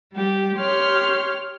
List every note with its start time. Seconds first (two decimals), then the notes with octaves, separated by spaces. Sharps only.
0.11 G3 G4
0.55 G4 C#5 C6 F6